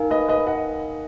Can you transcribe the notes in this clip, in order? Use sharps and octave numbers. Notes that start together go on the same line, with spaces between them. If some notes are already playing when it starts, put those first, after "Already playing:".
Already playing: D#4 A#4 F5 G#5
B4 D#5
B4 D#5
D#5 F#5